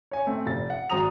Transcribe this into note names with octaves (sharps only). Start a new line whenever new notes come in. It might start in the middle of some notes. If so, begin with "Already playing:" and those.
C#5 G#5
A3 C4
F1 A6
F#5
G#1 F#4 C5 A#5 D#6 F7